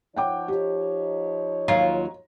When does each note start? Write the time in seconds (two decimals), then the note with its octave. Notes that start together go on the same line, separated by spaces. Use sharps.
0.16 F3 D#4 C#5 F#5 G5 D6
0.48 G4
1.68 D#2 F#3 F4 A#5